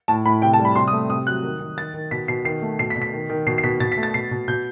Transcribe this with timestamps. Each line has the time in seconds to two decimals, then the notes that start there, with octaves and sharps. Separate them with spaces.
0.08 A2 A5
0.26 A2 B5
0.42 C3 G5
0.54 A5
0.59 G3
0.65 B5
0.76 C3 C6
0.88 D#6
0.93 A3
1.10 C3 D#6
1.27 F#3 F#6
1.44 D#3
1.61 D#3
1.77 D#3 A6
1.94 D#3
2.11 B2 B6
2.28 B2 C7
2.45 D#3 C7
2.62 A3
2.79 B2 C7
2.90 B6
2.96 B2
3.02 B6
3.13 D#3
3.30 D#3
3.47 B2 C7
3.58 C7
3.64 B2 B6
3.80 B2 A6
3.92 B6
3.97 A3
4.03 A6
4.14 B2 C7
4.31 B2
4.48 B2 G6